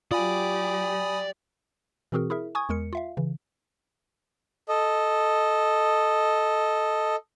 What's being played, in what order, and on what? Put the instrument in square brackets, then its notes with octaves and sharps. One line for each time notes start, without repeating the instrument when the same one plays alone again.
[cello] F#3 G4 [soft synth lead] F4 [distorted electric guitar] D5 [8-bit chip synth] G#5 B5 D#6
[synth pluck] B2 E3 C4 F#4 G#4 A#4
E4 G#4 A#4 E5
G#5 C#6 D#6 G#6
E2 G#3 A#4 C#7
F4 E5 F5
C#3 E3
[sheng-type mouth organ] A4 D#5